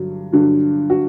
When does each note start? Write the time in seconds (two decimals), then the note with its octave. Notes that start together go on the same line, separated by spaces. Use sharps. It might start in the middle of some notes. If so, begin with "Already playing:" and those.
Already playing: G2 D3 F#3
0.33 G2 D3 F#3
0.90 F#4